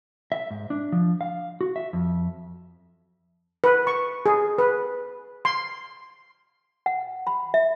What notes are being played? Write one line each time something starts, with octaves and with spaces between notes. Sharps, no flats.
E5
G#2
D4
F3
F5
F#4
E5
F2
B4
C#6
G#4
B4
C6
F#5
B5
E5